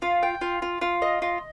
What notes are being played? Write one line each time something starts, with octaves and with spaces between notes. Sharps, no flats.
F4
G5
F4
F4
F4
D#5
F4